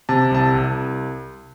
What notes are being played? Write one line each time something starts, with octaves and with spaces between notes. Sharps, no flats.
C3 A5
C2 A5
C2